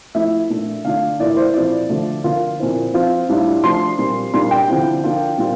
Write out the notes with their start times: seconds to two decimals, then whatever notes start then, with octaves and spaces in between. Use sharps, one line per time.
0.15 F3 A3 E4 E5
0.50 A#2 A3 D4
0.84 D3 A3 D4 F4 F5
1.19 A2 E3 A#3 F4 D5
1.37 C5
1.54 A#2 F3 C4 E4 D5
1.89 D3 F3 A3
2.24 D3 F3 A#3 F4
2.59 A#2 F3 C4 E4
2.94 F3 C4 F4
3.29 A2 G3 D4 F4
3.64 F3 A3 D4 C6
3.98 A#2 G3 C4
4.34 A#2 G3 D4 F4 C6
4.51 G5
4.68 D3 F3 C4 E4
5.04 F3 A#3 D4 F4
5.38 A#2 G3 C4 F4